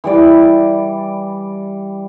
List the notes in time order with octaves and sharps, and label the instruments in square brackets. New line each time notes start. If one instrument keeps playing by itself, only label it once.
[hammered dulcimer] E3 G3 D5